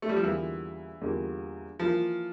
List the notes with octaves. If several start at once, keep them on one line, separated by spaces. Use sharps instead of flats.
A3
G3
F3
E2 D3 E3 G3 A#3 F4
E2 D3 G3 A#3 F4
E3 F3 A#3 F4